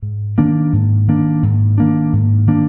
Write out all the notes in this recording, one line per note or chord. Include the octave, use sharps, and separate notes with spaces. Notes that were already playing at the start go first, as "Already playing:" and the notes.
G#2
D#3 A#3 D4
G#2
D#3 A#3 D4
G#2
D#3 A#3 D4
G#2
D#3 A#3 D4